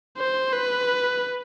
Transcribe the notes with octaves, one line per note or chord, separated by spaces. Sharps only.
C5
B4